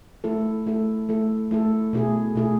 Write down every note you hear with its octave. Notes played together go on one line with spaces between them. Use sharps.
A3 E4 A4
A3 E4 A4
A3 E4 A4
A3 E4 A4
B2 A3 E4 G#4
B2 A3 E4 G#4